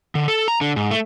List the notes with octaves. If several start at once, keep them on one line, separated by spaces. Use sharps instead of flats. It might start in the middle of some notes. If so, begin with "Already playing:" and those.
D3
A4
A#5
D3
G#2
A3